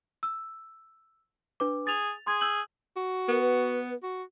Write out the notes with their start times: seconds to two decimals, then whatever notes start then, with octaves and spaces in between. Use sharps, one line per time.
0.23 E6
1.60 D4 B4 D6
1.87 G#4 A6 F7
2.27 G#4 C6 G#6
2.41 E6 G6 F#7
2.96 F#4
3.28 B3 A#4
3.42 B4
4.03 F#4